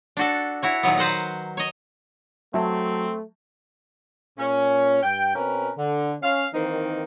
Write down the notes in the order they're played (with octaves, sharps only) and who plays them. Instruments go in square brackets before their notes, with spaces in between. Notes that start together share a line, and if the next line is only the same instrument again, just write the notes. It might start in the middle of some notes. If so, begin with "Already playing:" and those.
[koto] D4 F#4 A4
E4 F#4 C#5
A#2 D#3 F#3 B3
B4 C5 F#5 A#5
C#5 D#5
[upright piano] F#3 [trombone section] A3 [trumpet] C4 [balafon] E5 A5
[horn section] A#2 C#4
G2 G5
B2 C4 C#4 A#4 B4
D3
C#4 F5
D#3 E3 A#3 C4 D#4